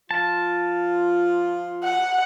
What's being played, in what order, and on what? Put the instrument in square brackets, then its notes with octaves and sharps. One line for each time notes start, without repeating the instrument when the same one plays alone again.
[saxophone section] F3 F4 [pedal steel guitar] A5
[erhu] F#5